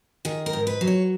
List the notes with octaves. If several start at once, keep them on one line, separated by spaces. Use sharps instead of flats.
D#3 G#4
A#4
G#2
B4
F#3
C#5